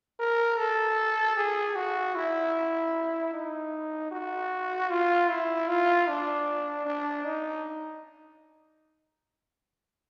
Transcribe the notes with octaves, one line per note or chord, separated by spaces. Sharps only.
A#4
A4
G#4
F#4
E4
D#4
F#4
F4
E4
F4
D4
D4
D#4